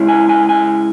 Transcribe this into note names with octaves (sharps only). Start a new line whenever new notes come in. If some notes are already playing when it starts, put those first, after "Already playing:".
Already playing: C#3 G#3 E4
G#5
G#5
G#5